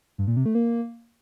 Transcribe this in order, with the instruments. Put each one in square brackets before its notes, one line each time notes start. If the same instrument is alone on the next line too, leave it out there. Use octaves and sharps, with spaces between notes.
[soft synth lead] G2
A#2
C3
A3
A#3